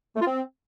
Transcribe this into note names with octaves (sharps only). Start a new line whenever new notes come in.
A3
F4
C4